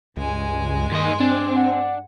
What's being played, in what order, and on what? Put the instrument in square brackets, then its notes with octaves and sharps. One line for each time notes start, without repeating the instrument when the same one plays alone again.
[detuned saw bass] C#2 [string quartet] G2 G#3 G#5
[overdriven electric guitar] D#2 D#5 [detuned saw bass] D#3 [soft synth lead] C6
[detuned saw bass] C4 [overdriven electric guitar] D4
[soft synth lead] F#5